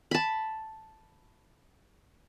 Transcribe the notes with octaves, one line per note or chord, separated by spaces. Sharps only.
A5 B5